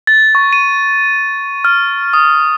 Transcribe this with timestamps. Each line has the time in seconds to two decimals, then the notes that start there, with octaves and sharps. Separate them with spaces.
0.07 A6
0.35 C#6
0.53 D#7
1.65 F6
2.13 D#6